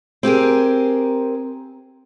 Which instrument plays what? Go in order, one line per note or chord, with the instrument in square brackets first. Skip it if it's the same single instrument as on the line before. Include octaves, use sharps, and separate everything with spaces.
[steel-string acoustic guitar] C4 G4 G#4 A#4